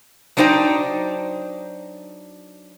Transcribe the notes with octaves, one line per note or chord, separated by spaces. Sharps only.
F#3 D4 D#4 C5 G5